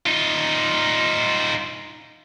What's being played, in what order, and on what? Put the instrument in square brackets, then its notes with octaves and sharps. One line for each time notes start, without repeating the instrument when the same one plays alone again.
[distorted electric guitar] D#4 F4